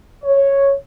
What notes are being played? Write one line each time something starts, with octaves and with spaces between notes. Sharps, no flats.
C#5